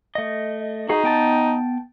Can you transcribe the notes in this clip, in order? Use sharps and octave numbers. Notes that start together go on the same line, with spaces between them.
A3 D#5
D#4 F#4 G#4
B3 G5 A5